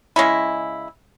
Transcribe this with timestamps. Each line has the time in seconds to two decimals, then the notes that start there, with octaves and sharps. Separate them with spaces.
0.16 C#3 G#3 C#4 E4